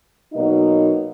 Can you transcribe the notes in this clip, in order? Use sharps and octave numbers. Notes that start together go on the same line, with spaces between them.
B2 F#3 A#3 D#4